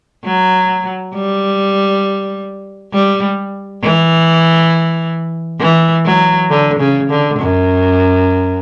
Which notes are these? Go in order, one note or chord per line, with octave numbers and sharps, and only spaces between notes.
F#3
G3
G3
E3
E3
F#3
D3
C#3
D3
F#2